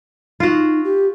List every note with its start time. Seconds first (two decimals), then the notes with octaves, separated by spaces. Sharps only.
0.40 D#4 F4 F#4
0.84 G4